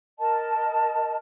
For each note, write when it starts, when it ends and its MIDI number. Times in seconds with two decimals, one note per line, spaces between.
0.19 1.17 70
0.19 1.17 75
0.19 1.17 81